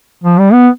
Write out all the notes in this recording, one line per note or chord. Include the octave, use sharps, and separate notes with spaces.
F3
G3
B3